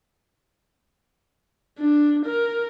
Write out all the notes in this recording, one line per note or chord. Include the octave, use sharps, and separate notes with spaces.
D4
A#4